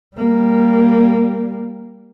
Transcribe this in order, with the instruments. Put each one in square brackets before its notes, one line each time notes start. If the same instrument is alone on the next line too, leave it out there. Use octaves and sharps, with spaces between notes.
[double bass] G3 A#3